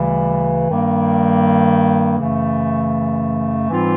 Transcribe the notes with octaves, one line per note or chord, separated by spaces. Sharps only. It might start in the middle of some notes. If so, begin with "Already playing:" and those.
Already playing: D2 C#3 E3 G3
G2 D#3 G3 A#3
F#2 C#3 E3 A3
G#2 E3 G3 C4 F4